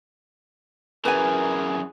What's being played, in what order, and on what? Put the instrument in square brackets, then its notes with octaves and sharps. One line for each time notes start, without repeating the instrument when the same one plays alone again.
[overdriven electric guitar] F#2 E3 [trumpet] G#4 [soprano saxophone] A#4 [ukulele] B4 G#5